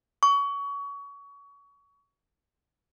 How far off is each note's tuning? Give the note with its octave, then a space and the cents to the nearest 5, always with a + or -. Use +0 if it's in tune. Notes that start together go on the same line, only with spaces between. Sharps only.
C#6 +25